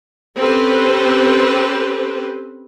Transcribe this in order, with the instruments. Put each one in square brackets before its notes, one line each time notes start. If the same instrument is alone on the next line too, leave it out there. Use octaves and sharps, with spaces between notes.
[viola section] C4 C#4 G4 A4 B4 C5